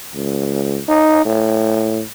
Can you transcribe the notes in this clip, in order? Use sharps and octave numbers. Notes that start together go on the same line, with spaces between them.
C#2
D#4
A2